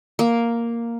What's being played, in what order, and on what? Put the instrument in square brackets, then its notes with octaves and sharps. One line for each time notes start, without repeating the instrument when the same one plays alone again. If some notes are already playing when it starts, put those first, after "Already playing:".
[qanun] A#3